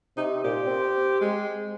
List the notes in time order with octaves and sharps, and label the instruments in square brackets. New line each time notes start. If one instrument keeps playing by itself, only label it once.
[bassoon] C3 [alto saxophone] D#4
[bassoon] A#2 [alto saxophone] G4
[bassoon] C4
[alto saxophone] G#3